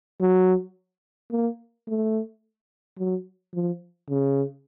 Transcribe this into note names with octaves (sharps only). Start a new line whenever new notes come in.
F#3
A#3
A3
F#3
F3
C#3